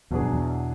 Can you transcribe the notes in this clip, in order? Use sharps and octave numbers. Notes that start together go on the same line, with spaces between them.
E2 B2 F#3 B3 D4 G#4
F#2
E2